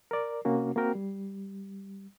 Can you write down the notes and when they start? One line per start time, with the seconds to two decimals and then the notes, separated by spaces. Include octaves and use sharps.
0.11 A#4 D5
0.45 C3 A#3 C#4 F#4
0.76 A#3 C4 F#4 A#4 G5
0.95 G3